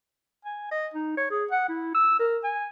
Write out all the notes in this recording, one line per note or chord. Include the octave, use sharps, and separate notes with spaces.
G#5
D#5
D#4
C#5
G#4
F#5
E4
E6
A#4
G#5